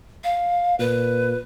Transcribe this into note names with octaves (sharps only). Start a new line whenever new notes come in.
F5
A#2 B4